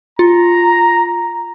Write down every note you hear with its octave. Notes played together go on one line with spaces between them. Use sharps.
F4 A#5